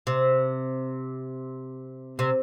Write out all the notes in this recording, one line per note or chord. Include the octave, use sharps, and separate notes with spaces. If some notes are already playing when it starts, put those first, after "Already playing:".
C3
C3